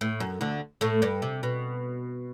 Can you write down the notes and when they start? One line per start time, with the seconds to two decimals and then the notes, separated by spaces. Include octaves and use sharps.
0.01 A2
0.20 F#2
0.41 D2 D3
0.81 A2 A3
1.02 G2 G3
1.22 C3
1.43 B2